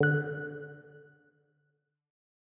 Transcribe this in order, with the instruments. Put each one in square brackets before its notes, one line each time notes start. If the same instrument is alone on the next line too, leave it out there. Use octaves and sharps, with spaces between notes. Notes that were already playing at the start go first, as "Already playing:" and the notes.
[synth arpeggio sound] D3 F#6